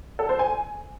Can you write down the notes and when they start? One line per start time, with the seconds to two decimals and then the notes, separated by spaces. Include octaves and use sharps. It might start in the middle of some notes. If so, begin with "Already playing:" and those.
0.19 A4
0.29 C5
0.39 G#5